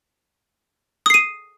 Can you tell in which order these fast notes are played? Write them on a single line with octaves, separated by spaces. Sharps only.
D#6 C7 D#7